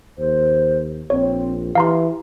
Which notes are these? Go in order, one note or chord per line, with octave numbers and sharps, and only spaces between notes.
D#2 C5
A#1 C4 C#5
E3 G4 F5 A#5 C6